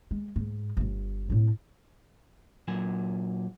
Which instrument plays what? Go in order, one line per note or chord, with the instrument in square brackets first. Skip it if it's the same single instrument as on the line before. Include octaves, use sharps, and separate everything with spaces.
[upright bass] G#3
G#2
D1 G1
A2 C4
[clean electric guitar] A#2 F#3 G#5